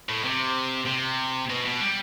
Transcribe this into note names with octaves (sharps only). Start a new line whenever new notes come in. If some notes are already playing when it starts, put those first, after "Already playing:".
A2
C3
C3
B2
B2
G3